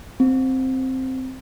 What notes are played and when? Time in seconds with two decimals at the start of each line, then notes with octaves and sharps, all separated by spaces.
0.20 C4